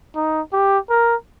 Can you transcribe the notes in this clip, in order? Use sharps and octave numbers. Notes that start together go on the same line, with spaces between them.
D#4
G4
A#4